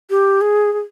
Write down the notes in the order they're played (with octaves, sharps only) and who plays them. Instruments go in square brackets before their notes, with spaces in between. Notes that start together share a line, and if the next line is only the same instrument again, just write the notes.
[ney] G4
G#4
G#4